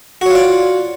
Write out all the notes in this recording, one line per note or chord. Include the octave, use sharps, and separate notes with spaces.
F4 F#4 C#5 D5